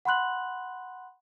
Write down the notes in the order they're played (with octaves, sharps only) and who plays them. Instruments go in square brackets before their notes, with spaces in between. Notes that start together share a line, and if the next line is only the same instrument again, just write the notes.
[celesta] F#5 B5 C6 F#6 F#7